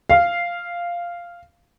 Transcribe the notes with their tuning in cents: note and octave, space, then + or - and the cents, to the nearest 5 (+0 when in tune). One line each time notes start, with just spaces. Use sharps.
F5 -5